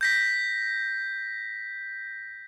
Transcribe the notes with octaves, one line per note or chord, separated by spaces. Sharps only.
G6 A#6 B6